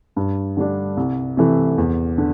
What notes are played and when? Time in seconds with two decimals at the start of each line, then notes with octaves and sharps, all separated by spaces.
0.16 G2
0.57 D3 G3 D4
0.97 C2
1.37 C3 E3 A3
1.78 E2
2.18 D3